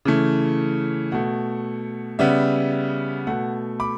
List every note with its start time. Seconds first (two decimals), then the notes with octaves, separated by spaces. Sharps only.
0.05 C#3 E3 A3
1.12 B2 A3 F#5
2.19 C#3 G3 B3 E5
3.27 B2 A3 F#5
3.80 B5 D6